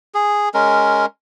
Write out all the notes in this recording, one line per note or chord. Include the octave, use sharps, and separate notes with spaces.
G#4
G#3 C#4 A#4